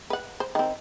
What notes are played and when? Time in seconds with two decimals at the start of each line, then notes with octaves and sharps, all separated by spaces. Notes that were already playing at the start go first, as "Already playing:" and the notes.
0.10 B4 F#5
0.40 C5
0.55 D#3 C4